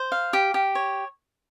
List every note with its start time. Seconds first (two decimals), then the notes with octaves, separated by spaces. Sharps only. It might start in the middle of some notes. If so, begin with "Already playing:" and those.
Already playing: C5
0.12 F5
0.33 G4
0.54 G4
0.75 C#5